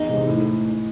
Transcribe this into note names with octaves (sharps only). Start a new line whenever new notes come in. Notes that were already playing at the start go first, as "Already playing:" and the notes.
Already playing: E2 D#4
C3 D#3 G#3
A2